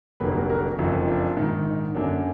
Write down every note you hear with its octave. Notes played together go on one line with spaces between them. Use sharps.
F1 F2 D3 F#3 A#3 G#4 B4
F#4 A#4
F#4 A#4
F#1 F2 F3 D#4 F#4
D4 F4
A#1 G#2 D#3
D#4
F#2 D3 F#3 A#3 D4